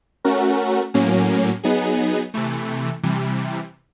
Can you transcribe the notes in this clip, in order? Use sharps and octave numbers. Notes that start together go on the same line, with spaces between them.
A3 C#4 F#4 A#4
A2 F#3 A#3 C#4
F#3 B3 D#4 G#4
C3 E3 A3
C3 E3 G3